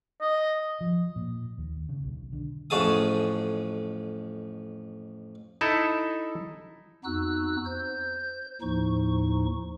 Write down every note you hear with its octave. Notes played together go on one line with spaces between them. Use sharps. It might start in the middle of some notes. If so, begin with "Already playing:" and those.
D#5
F3
A#2
D#2
C#3
B1
D3
A1 F2 F#4 G#4 A5 D#6
D#4 E4 A4 E5
F2 B3 D#4 F#4 E6 F#6
C5 G6
D#2 A2 F3 D#4 C#6